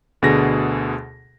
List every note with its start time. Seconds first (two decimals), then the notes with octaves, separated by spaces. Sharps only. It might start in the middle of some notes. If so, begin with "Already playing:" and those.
0.22 D2 B2 D3 G#4 A#6